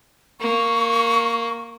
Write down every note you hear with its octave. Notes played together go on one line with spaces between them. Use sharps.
A#3 C#6